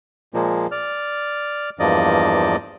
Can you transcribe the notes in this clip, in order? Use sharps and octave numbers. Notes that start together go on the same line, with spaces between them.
A#2 F3 G#3 A#3
D5 F6
E2 G2 F3 A#3 D5 D#5